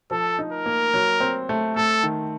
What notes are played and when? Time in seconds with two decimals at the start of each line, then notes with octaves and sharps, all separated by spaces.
0.11 F3 A4
0.39 D#4
0.52 A#4
0.66 A#3
0.94 F#3
1.20 C4
1.49 A3
1.76 A3 A4
2.03 D#3